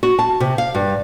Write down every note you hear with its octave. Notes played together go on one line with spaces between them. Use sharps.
F#4
A5
C3
F5
G2